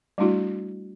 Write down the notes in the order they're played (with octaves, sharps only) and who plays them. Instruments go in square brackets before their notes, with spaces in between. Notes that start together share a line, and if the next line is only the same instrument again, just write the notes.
[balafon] G3 A3 D4 E4 F#4